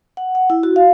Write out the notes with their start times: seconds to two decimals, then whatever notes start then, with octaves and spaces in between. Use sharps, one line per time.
0.17 F#5
0.35 F#5
0.50 E4
0.63 F#4
0.76 F5